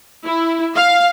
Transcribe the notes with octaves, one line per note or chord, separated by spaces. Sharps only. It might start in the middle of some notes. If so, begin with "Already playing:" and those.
E4
F5